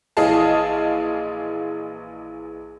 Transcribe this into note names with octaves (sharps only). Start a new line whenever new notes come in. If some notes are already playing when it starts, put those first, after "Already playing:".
A#1 E3 G#4 D#5 F5 A5